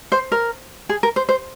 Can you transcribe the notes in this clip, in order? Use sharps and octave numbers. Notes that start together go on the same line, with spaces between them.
C5
A#4
G#4
A#4
C5
C5